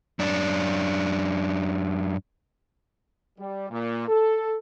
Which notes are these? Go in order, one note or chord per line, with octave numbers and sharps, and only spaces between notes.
F#2 D4
G3
A#2
A4